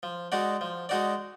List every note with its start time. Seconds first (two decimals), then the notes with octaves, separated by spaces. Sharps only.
0.03 F3
0.32 G#3 D#4 F#4 D5
0.61 F3
0.89 G#3 D#4 F#4 D5